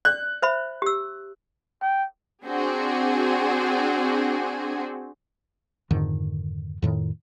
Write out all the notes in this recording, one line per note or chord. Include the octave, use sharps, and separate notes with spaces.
D5 F#6
C5 E5 B5
G4 E6
G5
C4 D4 F#4 G#4
F2 G#2 D3 D#3
F2 A2 D#3